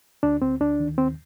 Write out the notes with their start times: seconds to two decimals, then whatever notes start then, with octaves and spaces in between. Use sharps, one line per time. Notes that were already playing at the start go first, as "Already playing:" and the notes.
0.23 D2 D4
0.42 D2 C4
0.60 D2 D4
0.80 D#3
0.98 D#2 C4